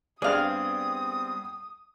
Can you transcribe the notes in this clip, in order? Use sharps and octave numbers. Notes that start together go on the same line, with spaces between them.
G2 G3 B3 C4 G#4 D5 F5 D#6